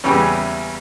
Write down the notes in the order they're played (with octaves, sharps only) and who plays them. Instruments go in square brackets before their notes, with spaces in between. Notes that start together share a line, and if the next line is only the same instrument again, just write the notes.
[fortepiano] E2 C#3 E3 G3 C#4